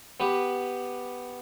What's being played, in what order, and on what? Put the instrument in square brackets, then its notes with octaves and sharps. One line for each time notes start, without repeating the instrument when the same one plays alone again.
[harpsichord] B3 G4 B4